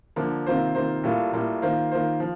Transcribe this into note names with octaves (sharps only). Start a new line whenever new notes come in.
D3 F3 A#3
C3 D#3 A#3 F4 C5
C3 D#3 A#3 F4 C5
A2 G3 A#3 F4 A4
A2 G3 A#3 F4 A4
D#3 A#3 F4 C5
D#3 A#3 F4 C5
F3